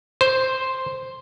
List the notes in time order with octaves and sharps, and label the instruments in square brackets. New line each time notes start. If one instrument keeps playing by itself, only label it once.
[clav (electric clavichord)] C5